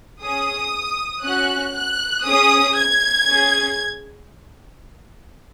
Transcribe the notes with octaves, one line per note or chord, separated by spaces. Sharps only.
C#4 G#4 D#6
C#4 F#4 F#6
F#6
C#4 G#4 D#6
G#6
C#4 G#4